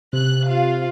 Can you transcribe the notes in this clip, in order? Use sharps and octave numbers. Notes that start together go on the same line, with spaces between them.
C3 F#6
F4 F5